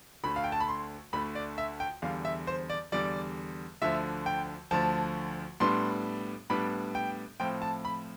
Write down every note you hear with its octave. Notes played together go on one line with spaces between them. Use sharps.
D2 D3 A3 B5
F5
G5
A5
B5
C6
D2 D3 A3 B5
D5
E5
G5
E2 D3 G3 F5
E5
C5
D5
E2 D3 G3 D5
D2 D3 F3 E5
G5
D2 D3 F3 A5
A2 G3 B3 D4 C6
A2 G3 B3 D4 B5
G5
A2 F3 C4 G5
A5
B5